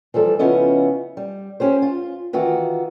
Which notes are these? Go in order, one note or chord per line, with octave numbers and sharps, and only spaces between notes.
E3 F3 G3 A4
C#3 F3 B3 C#4 E4 D#5
G3
C#4 G4 C5
F4
D#3 E3 F4 F#4